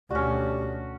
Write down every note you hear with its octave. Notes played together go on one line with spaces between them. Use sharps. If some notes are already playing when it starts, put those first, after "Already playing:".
D2 B2 G3 C#4 F#4